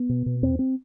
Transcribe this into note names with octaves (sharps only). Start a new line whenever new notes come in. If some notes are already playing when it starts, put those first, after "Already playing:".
Already playing: B3
B2
B2
E2 C4
C4